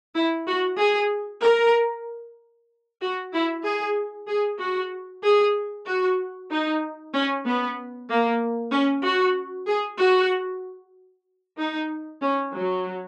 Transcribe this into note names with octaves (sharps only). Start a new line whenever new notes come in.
E4
F#4
G#4
A#4
F#4
E4
G#4
G#4
F#4
G#4
F#4
D#4
C#4
B3
A#3
C#4
F#4
G#4
F#4
D#4
C#4
F#3